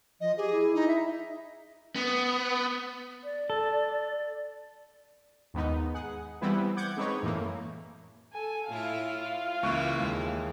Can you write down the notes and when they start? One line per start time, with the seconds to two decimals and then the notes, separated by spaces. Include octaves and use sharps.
0.21 F3 D#5
0.37 G4 G#4
0.52 E4
0.75 D#4
0.88 E5
1.96 B3
3.24 D5
3.50 A4
5.54 D#2 G#2 B3 D#4
5.94 G#4 F#5
6.41 E3 G3 B3 C4 E4 B4
6.77 F#5 D6 G6 G#6
6.97 G#3 C4 D#4 B4 C#5
7.23 F#2 A2 E3 A3 A#3
8.33 A4 G#5
8.69 A2 E4 F4 F5
9.63 C#2 E3 A#3 E4 C#6 F#6
10.00 D#2 G#3